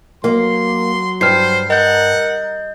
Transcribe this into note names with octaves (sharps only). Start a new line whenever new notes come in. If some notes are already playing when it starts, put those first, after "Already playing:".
F#3 A#3 C6
G2 C5 F6 C7
A#4 D#5 F#5 G6